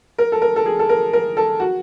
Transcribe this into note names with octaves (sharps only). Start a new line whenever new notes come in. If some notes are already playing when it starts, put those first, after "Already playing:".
A#4
A4
A#4
A4
G#4
A4
A#4
A#4
A4
F#4